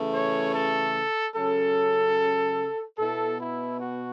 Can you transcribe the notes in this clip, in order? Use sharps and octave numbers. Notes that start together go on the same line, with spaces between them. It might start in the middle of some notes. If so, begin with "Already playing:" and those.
Already playing: C#3 E3 A3
C#5
A4
C#3 F#3 C#4 A4
B2 B3 E4 A4
E4
F#4